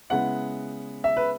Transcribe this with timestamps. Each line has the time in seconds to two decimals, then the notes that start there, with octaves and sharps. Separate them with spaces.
0.10 C#3 G#3 B3 E4 F#5
1.04 E5
1.17 B4